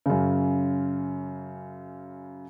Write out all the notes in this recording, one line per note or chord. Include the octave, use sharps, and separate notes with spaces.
F#2 C#3